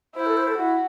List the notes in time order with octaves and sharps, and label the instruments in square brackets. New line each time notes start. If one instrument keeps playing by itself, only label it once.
[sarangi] E4 [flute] C5
[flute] A4
C5
A4
[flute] E4 [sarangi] F#4